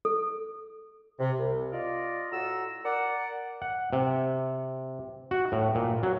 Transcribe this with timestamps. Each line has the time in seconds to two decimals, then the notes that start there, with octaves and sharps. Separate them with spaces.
0.05 A4
1.19 C3
1.39 C2 C3
1.72 F4 D5 D#5
2.32 A2 F4 F#4 A4 A#5 E6
2.84 A#4 D5 F#5
3.62 F#5
3.93 C3
5.31 F#4
5.52 A2
5.75 A#2
6.03 F#3